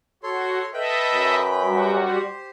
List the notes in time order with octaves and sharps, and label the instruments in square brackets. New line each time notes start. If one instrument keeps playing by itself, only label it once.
[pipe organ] F#4 [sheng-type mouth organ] A4 C#5 C6
[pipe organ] A4 D#5 E5 [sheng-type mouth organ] B4 G5 B5
[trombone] F#2
[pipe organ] G3 F#4
[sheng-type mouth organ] G4 C5